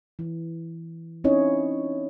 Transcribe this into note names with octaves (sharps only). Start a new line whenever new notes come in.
E3
C4 C#4 D#4 E4 C#5 D#5